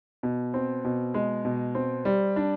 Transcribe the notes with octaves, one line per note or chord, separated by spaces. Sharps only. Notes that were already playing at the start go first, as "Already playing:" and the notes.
B2
C4
B2
G#3
B2
C4
G3
D4